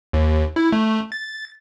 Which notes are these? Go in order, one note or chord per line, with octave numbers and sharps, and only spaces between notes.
D#2
E4
A3
A6